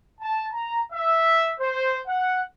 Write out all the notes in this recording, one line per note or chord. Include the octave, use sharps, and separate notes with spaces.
A5
A#5
E5
C5
F#5